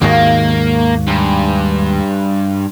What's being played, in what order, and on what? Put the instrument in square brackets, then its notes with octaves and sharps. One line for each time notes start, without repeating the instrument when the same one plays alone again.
[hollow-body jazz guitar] D#2 G#2 D#3 [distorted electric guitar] A#3 [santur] F#4 F5
[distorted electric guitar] G2 [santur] G#5 A#5 C6